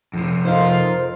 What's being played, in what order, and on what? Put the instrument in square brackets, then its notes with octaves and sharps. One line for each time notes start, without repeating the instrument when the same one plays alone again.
[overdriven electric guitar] F2 C3
[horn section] D#4 F4 [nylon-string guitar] A4 A#4 C5